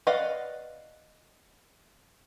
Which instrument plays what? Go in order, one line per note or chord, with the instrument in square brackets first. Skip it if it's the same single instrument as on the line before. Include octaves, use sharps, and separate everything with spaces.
[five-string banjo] B4 D5 D#5 F5 F#5